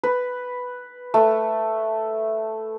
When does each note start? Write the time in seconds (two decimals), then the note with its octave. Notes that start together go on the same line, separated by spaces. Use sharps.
0.03 B4
1.14 A3